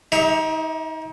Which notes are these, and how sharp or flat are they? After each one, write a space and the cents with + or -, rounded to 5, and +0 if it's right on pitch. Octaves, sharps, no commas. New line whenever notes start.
D#4 +30 G4 +30 E5 -20